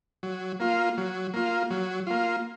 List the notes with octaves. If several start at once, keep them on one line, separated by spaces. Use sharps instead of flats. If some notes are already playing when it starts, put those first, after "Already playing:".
F#3
A#3 F4
F#3
A#3 F4
F#3
A#3 F4